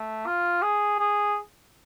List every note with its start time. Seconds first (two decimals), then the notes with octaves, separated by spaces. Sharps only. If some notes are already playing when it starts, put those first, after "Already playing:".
Already playing: A3
0.26 F4
0.62 G#4
0.99 G#4